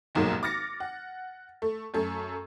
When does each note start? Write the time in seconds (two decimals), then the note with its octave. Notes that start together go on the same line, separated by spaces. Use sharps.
0.15 F1 B1 G#2 F#3 G#3 A#3
0.43 D6 F6 A6 A#6 C#7
0.80 F#5
1.62 A3
1.94 F#2 A3 A4